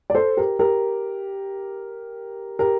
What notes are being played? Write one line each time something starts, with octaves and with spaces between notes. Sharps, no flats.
D5
A4 C5
G4 A#4
G4 A#4
G4 A#4